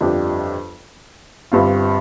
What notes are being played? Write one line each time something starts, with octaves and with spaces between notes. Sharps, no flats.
G1 F2 F3 D4 G4
G1 G2 G3 C4 F4